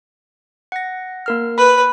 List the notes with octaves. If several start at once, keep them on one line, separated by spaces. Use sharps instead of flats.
F#5 A#6
A#3 A#4 F6
B4 B5